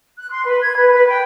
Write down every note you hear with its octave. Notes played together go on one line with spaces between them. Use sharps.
F#6
C6
B4
G#6
B4
B4
G5